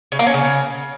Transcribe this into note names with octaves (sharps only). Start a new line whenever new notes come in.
C#3
A#3
C#4
C#3